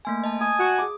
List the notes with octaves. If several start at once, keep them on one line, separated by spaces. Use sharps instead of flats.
A3 A#3 G#5
D#5 A5
G#5 D#6
F#4
G#4 D6